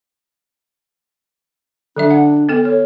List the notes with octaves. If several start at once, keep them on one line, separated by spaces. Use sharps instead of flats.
D3 F#3 D4 E5
F#5
B3 A4 G5
A4 C#5